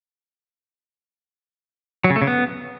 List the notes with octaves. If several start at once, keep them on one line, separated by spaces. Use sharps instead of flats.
F#3
C#3
A3
C#3
B3